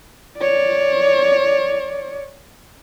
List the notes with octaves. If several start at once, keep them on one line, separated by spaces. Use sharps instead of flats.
C#5 D5